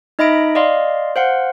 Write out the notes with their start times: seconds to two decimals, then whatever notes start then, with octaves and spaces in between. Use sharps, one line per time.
0.19 D#4 D#5 E5 B5 A#6 D7
0.55 D5 D#5 F5 C6
1.16 C5 F5 F#5